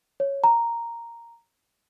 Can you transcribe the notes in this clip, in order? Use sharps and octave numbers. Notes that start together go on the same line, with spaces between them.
C#5
A#5